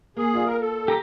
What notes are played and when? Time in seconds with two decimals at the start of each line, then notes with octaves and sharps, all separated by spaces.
0.17 A#3 G#4
0.33 F4 D5 F5
0.46 A#4
0.60 A4
0.88 G4 A#5